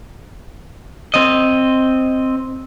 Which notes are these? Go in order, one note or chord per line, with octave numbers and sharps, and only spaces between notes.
C4 D#5